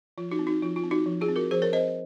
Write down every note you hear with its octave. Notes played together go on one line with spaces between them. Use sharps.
F3 F4
D#4 F#4
C4
D#4 F#4
F3 F4
F4
C4
D#4 F#4
F3
F4 G#4
C4
F#4 A#4
F3 G#4 C5
A#4 C#5
C4 C5 D#5